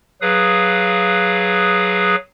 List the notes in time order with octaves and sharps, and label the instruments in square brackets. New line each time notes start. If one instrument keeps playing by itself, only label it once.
[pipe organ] F#3 G#4 B4 F5 D#6